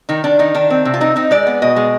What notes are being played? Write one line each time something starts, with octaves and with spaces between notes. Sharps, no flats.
D#3 D#4
D#3 D4
D#3 D#4
D#3 D4
C4
C3
F4
C4 D#4
C4 D#4
G#3 D5
B3
B2 D#5
G#3